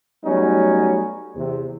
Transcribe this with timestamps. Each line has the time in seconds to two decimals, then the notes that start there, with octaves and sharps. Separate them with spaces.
0.25 F#3 G3 A3 B3 C#4 D#4
1.37 E2 C3